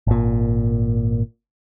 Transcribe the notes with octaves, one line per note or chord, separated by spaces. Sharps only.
G#1 A#2